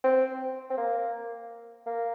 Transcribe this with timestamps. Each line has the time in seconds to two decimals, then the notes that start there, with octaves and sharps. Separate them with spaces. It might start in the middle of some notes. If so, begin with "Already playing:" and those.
0.04 C4
0.70 C4
0.77 A#3
1.86 A#3